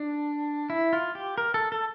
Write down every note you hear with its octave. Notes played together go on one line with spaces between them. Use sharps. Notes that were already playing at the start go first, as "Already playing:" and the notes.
Already playing: D4
E4
F4
G4
A#4
A4
A4